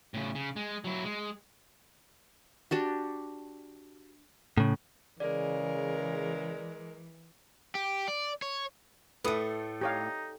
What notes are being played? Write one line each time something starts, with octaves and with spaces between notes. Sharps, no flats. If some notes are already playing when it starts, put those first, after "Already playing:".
A2 C#3
C#3
G#3
F#3 E4
G#3
D4 F#4 G4
A2 C#3
C#3 E3 G#3 A#4 D5
G4
D5
C#5
A2 A3 A4 B4 D#6
D#4 G4 C#5 F5